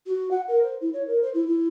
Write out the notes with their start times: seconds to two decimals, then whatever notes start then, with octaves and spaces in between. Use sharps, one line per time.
0.06 F#4
0.31 F#5
0.48 A#4
0.63 C5
0.81 E4
0.93 C#5
1.07 A#4
1.22 C5
1.34 E4
1.47 E4